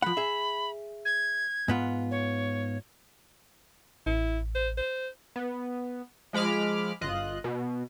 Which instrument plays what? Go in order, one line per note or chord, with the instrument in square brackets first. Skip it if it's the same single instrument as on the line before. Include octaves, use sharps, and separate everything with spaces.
[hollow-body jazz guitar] F3 F#5 [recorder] B5
[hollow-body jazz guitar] G#4 E5
[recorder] G#6
[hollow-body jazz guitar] G#2 B3 F4
[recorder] C#5
[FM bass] A1 [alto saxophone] E4
[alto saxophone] C5
C5
[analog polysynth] B3
F3 G#3 B5 D6 F6
G1 F4 D#5 F#6
B2